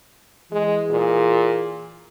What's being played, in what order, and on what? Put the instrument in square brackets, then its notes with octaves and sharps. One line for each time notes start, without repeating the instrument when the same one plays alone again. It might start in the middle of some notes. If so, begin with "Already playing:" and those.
[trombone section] E3 G#4 [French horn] G#3
[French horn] A#2